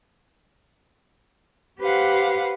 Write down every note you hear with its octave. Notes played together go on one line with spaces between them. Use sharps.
G4 B4 C5 F5 F#5